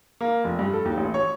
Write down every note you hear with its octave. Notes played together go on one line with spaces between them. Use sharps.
A#3
F1
G2
A4
D#2
A1
C#5